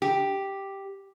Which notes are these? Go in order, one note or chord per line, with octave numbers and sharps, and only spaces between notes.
G4